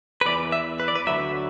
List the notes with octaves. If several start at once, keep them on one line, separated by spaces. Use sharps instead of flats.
B4
E2 E3 D5
E5
B4
D5
B4
D2 D3 F#3 E5